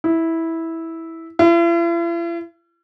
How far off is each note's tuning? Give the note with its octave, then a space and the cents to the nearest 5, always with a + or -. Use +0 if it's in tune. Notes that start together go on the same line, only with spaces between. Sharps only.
E4 -10
E4 +45